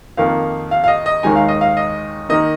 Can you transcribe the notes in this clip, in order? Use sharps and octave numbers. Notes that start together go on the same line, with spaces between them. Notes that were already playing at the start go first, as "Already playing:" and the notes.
F2 D#3 A#3 F5
F5
F5
D#5
D#5
D#2 D#3 G#3 D#4 G#5
F5
D#5
F5
D#5
D#3 A#3 D#4 D#5